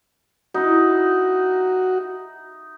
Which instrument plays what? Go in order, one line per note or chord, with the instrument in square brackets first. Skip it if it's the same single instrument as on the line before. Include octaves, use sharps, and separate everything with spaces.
[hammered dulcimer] D#4 E4 [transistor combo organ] F#4